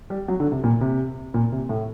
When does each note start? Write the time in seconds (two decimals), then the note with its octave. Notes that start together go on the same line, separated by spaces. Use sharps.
0.10 G3
0.28 F#3
0.40 D3
0.52 C3
0.64 A#2
0.81 C3
1.34 A#2
1.52 C3
1.69 A2